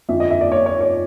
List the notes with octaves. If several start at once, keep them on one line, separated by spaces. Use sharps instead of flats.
F2 D3 F3 E5
D#5
E5
D5
C#5
C#5
C#5